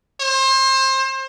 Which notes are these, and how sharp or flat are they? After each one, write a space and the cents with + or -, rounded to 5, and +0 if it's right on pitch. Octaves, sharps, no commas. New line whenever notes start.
C5 +25